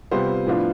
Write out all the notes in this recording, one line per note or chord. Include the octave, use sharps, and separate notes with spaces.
C3 G3 B3 F4 C5
A2 F3 B3 D4 F4